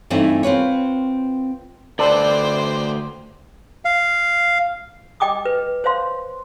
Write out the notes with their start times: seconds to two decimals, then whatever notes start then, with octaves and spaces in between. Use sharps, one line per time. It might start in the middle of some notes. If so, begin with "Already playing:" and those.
0.10 G2 E3 A3 C4 D#4
0.43 C4 F4 B4 C#5
1.99 D2 A4 B4 C5 D5 G5
3.85 F5
5.20 D#5 G5 D6 D#6
5.45 B4
5.84 C5 C#5 F5 C6